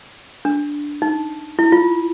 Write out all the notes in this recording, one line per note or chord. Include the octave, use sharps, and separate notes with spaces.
D4
D#4
E4
F4